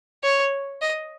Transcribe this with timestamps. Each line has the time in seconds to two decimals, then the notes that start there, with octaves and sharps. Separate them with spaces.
0.24 C#5
0.82 D#5